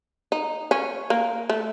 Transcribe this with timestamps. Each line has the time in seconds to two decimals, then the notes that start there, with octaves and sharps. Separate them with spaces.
0.32 D#4
0.71 C#4
1.10 A#3
1.49 A3